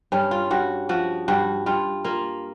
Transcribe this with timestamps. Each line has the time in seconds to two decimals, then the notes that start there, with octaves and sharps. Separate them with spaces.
0.12 G2 C#4
0.31 F4
0.51 G2 F#4
0.89 F3 F#4
1.28 G2 F#4
1.66 G2 F4
2.04 A#3 F4